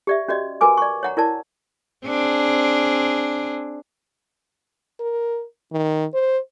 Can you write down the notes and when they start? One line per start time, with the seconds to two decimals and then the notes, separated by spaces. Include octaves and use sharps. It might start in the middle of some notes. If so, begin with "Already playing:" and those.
0.07 G4 D5 E5
0.28 C#4 F#4 D5 D#5
0.61 F#4 A#4 B4 G#5 D6
0.77 D5 C#6
1.03 C#5 F#5 A#5
1.17 E4 A#4 D5 A5
2.06 C4 D4 G#4
5.00 A#4
5.72 D#3
6.14 C5